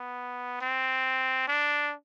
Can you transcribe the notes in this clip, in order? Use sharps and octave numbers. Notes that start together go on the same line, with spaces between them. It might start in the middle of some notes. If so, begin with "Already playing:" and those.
Already playing: B3
C4
D4